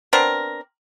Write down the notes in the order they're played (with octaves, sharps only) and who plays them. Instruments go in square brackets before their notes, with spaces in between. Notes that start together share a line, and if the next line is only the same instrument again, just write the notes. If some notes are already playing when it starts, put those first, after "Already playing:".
[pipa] B3 C4 D4 A#4